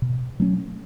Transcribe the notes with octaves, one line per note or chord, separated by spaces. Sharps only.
B2
F#3 A3 C#4